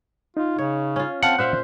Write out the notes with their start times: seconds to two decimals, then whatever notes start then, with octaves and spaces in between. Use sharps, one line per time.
0.37 D#4 F4
0.58 C#3 C#5
0.96 C#4 F4
1.23 C4 F5 F#5 A5 F6
1.39 A#2 C5 E5 F5 F#6